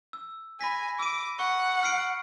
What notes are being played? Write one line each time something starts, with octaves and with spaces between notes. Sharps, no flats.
E6
G#5 B5 A#6 B6
D6 E6 D#7
F#5 C#6
F6 C7 D7